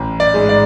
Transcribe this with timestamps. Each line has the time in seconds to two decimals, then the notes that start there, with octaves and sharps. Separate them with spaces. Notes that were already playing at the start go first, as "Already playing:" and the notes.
Already playing: A1
0.20 D5
0.34 G#2 G#3
0.49 D5